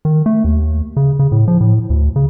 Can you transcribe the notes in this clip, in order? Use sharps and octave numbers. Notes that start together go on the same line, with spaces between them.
D#3
A3
D#2
C#3
C#3
A2
F3
A2
D2
C#3